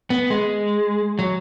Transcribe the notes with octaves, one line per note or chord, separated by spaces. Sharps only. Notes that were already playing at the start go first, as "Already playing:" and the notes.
B3
G#3
F#3